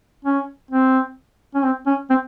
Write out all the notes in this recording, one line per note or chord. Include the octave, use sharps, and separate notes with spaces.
C#4
C4
C#4
C4
C#4
C4